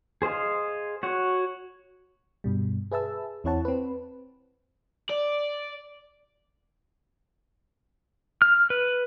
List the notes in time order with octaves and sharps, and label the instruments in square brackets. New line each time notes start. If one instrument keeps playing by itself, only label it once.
[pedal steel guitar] G#4 C5 D#5 F5
F#4 C#5 F#5
[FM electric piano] G2 B2 G3
G#4 B4 E5 A5 E6
E2 C4 E4 C#5 F#5 A5
C4 B4
[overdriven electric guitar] D5
[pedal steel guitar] F6
B4